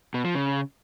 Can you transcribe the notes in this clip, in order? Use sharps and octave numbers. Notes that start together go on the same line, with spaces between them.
B2
F3
C#3